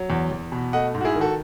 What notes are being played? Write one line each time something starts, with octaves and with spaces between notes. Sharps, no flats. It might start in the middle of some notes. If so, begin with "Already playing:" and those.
Already playing: F#3
E2
E2
B2
A3 D#5 F#5
G#2
F#4
E4 G#4
D#3
F#4 A4